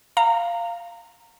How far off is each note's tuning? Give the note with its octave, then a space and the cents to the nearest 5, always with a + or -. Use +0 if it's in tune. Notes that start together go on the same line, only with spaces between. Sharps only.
F5 -10 A#5 -20